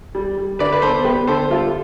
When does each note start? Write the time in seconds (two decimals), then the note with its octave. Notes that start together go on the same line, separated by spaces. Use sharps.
0.15 G3
0.37 G3
0.59 D3 B4 D5
0.72 B4
0.82 B3 A4 C5
1.04 B3 G4 B4
1.27 D3 A4 C5
1.50 G3 F4 A4